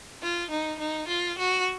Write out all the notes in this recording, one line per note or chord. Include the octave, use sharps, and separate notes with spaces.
F4
D#4
D#4
F4
F#4